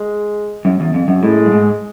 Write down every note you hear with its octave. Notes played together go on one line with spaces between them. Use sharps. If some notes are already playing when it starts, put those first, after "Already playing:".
Already playing: G#3
F#2
E2
F2
F#2
A2 G#3
G2
G#2